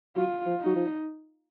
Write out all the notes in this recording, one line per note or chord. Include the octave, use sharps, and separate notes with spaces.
F#3 F4
F3
F#3 D#4
F3